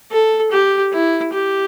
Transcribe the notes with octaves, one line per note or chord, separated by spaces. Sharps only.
A4
G4
E4
G4